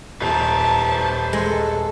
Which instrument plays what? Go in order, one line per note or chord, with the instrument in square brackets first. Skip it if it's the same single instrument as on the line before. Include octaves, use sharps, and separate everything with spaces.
[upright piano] D#1 [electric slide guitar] B4 C5 A#5 [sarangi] A5
[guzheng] G#3 [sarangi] A4